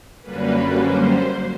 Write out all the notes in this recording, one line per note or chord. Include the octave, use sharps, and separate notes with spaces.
F#2 D3 G3 A#3 C#4 B4
C5